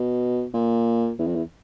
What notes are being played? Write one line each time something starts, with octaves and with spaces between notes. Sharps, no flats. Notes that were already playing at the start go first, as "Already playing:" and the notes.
Already playing: B2
A#2
E2
F2
E2